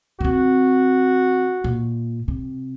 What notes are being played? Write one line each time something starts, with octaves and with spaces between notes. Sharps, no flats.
D#3 C4 F#4
A#2
C3